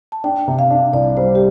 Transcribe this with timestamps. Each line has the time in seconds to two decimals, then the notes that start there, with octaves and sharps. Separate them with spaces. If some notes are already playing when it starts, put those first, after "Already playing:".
0.12 A5
0.24 D4 G5
0.48 C3
0.59 F5
0.71 D4
0.93 C2 D5
1.17 G3 C5
1.35 G4